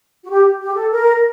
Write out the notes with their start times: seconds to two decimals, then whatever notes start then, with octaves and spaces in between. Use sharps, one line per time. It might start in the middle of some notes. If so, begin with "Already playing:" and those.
0.24 F#4
0.30 G4
0.60 G4
0.75 A4
0.91 A#4